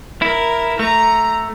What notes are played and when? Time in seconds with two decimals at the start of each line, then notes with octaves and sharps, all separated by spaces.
0.22 E4 A#4
0.79 A3 A#5